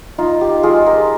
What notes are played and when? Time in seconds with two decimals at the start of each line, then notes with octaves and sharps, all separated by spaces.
0.18 D#4 F4
0.41 G4
0.63 G#3 F4 G#4
0.86 G4 A#4